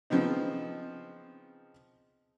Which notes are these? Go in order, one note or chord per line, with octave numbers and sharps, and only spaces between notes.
C#3 F3 B3 C4 D#4